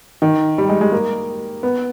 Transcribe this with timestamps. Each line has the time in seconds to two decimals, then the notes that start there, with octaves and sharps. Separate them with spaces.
0.22 D#3
0.58 G3
0.69 G#3
0.81 G#3
0.92 A#3
1.63 B3